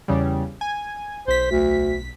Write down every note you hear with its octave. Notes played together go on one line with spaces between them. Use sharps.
E2 C#3 G3
G#5
B1 C5 B6
D2